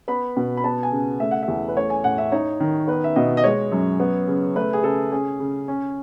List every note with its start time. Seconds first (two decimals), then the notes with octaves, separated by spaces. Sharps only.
0.08 B3 B5
0.37 B2
0.57 B5
0.64 B3 A5
0.83 G#5
0.92 C#3
1.20 A3 E5
1.31 F#5
1.43 E5
1.48 E2
1.68 B4
1.76 A3 C#5
1.90 G#5
2.04 A2 F#5
2.18 E5
2.32 D#4 C#5
2.60 D#3
2.87 B3 B4
3.04 E5
3.16 B2 D#5
3.37 D#5
3.44 G#3 C#5
3.72 F#2
4.00 B3
4.28 C#3
4.56 A3 B4
4.73 G#4
4.84 C#3 A4
5.12 C#4 G#4
5.40 C#3
5.68 C#4